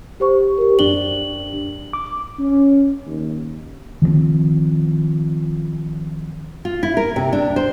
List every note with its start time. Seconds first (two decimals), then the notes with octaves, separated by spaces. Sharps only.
0.20 G4 C5 C#6
0.58 G4 A#4
0.79 F#2 D4 G4 F#7 G7
1.93 D6
2.39 C#4
3.06 D#2
4.02 D#3 F3 G#3 C4
6.65 F4
6.83 E4
6.97 A#4
7.16 C3
7.33 D4
7.56 C5